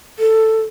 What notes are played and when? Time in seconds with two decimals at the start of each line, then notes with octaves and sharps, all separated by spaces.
0.19 A4